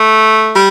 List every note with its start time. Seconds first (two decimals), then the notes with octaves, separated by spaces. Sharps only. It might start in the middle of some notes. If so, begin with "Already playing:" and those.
Already playing: A3
0.54 G3